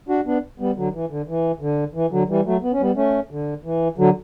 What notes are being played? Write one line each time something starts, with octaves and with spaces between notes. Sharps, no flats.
D4 F#4
B3 D4
G3 B3
D3 F#3
E3
D3
E3
D3
E3
D3 F#3
E3 G3
F#3 A3
B3
C#4
G3 B3
A3 C#4
D3
E3
D3 F#3